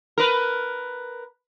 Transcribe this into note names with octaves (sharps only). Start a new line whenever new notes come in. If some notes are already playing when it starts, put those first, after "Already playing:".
A#4 B4